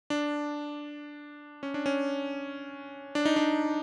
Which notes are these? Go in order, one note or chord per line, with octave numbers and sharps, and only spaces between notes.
D4
C#4
D4
C#4
D4
D#4
D4